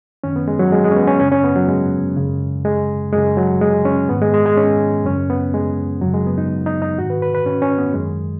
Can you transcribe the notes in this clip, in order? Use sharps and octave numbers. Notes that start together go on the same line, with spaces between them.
F#2 D#3 C#4
B3
G#3
F#3
G#3
G#3
C#4
B3
C#4
F#2 C#3 C#4
C#4
B3
F#3
G#3
F#2 C#3
G#3
F#2 C#3 G#3
F#3
G#3
C#4
G#2 D#3 B3
G#3
G#3
G#3
C#4
F#2 C#3 C#4
B3
G#3
F#2 C#3 F#3
G#3
B3
D#4
D#4
D#4
G#2 D#3 F#4
B4
B4
B4
C#4
C#4
B3
F#2 D#3 G#3